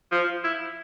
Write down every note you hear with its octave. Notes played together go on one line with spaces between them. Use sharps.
F3
E4